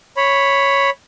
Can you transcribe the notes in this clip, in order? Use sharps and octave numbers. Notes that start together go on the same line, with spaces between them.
C#5 B5